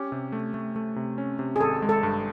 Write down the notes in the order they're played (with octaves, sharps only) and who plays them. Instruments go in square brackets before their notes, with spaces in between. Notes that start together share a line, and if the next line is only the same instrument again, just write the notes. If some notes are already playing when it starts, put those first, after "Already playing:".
Already playing: [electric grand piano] C#4 [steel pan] G4
[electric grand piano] C3
A3
A3
A3
C3
C#4
C3
[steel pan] G#4
[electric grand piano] G#1 [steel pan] A4
[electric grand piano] G#3
[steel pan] A4
[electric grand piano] G2